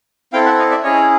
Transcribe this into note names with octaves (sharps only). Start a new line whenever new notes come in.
C4 E4 A4 F5 G5
E5 F#5
D#5 F5
D5 E5
C#4 E4 G#4 C#5 D#5